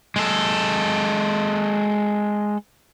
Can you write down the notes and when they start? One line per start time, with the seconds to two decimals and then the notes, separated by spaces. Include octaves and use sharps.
0.16 G#3 A4